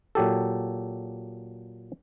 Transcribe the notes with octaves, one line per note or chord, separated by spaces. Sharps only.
A#2 F#3 G4 A4